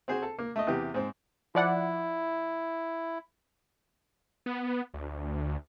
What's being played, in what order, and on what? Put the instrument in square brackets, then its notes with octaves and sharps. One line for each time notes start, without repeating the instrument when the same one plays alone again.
[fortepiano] C4 F#4 G#4 C5
A4
A#3
A3 D#5
E2 C3 E3 G4
G#2 C4
[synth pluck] F3 D5 F#5 [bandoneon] E4
[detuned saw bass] B3
D2